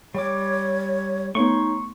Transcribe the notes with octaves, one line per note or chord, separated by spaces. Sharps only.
G3 C#5 C#6 D6
A3 B3 D#4 C#5 C6 C#6